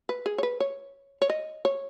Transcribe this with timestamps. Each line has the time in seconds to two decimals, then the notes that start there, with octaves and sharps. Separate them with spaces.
0.09 B4
0.26 G#4
0.38 C#5
0.43 B4
0.60 C#5
1.22 C#5
1.30 D#5
1.65 C#5